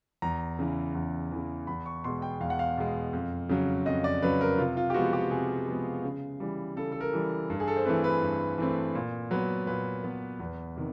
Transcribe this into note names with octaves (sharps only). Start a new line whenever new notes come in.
E2 A#5
C#3 E3
E2
C#3 E3
E2 B5
C#6
B2 G#3 C6
G5
E2 F5
F#5
F5
B2 G#3
F2
C#3 F#3
F2 D#5
D5
C#3 F#3 B4
A#4
C3 F4
F4
G4
F3 G#3 B3 F#4
G4
C3 G#4
F3 G#3 B3
C#3
E3 G3
C#3 A4
A4
A#4
E3 G3
G2
G#4
A4
C5
E3 A3 C4 B4
B4
G2
E3 A3 C4
A#2
F#3 B3 B4
A#2 B4
F#3 B3
E2
C3 D#3